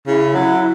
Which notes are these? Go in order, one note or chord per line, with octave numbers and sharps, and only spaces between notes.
C#3 E4
F#3